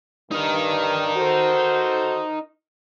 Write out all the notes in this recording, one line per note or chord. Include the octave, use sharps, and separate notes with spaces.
G2 D#4 A#4
F#4 A4 C5